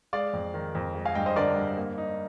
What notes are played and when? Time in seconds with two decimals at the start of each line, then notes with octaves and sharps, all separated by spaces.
0.13 G#3 D5 F5
0.33 F2
0.54 D#3
0.75 F2
0.95 G#3
1.05 F5 G#5
1.15 G2 D#5 G5
1.26 C5 D#5
1.36 D3 A#4 D5
1.56 G2
1.77 A#3
1.98 D#4